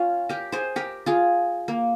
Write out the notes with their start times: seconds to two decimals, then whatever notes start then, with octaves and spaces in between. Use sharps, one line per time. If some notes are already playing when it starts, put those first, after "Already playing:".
Already playing: C#4 F4
0.29 G4 A#4
0.52 G#4 C5
0.76 G4 A#4
1.06 F4 G#4
1.68 A#3